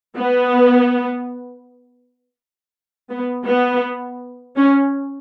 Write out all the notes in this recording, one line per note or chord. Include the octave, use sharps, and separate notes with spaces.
B3
B3
B3
C#4